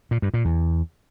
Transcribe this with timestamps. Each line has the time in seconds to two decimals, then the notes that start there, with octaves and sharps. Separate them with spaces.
0.11 A#2
0.22 G2
0.34 A#2
0.45 E2